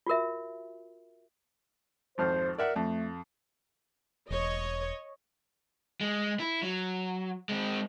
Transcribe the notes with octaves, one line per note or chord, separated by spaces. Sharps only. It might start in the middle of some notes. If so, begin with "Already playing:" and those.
F4 F#4 A#4 E5
G#1 F2 C5 F6
A#4 D5 E5 F#5
F2 A3
E1 C#5 D#5
G#3
E4
F#3
G#3 C4